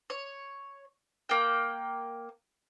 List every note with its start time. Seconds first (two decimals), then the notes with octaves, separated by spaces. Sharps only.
0.10 C#5
1.29 A#3 G5